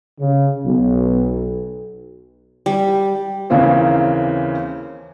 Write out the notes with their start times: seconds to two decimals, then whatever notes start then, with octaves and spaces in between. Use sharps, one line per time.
0.19 C#3
0.64 B1
2.66 G3
3.50 D#2 C#3 E3 A#3 C4